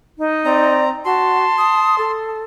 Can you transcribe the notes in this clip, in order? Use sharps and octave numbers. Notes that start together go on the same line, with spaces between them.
D#4
C4 D5 A#5
F#4 A5 C6
D#6
A4